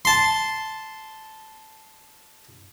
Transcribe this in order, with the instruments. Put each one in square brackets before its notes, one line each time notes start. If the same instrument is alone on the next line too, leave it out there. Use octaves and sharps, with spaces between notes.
[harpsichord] A5 C6